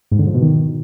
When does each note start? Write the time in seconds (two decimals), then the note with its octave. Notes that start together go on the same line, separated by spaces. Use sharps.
0.11 G#2
0.19 D3
0.27 F3
0.34 B2
0.42 D#3